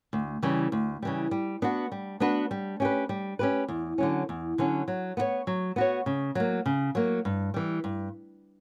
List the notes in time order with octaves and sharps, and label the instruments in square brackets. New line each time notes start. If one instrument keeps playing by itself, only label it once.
[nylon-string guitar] D2
C#3 E3 G3
D2
C#3 E3 G3
G3
B3 D4 F#4 B4
G3
B3 D4 F#4 B4
G3
C#4 G4 B4
G3
C#4 G4 B4
E2
D3 F#3 C#4
E2
D3 F#3 C#4
F#3
B3 F#4 C#5
F#3
B3 F#4 C#5
C#3
F#3 A#3
C#3
F#3 A#3
G2
E3 G3
G2